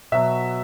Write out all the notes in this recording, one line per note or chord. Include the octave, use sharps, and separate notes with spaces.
B2 F#3 E5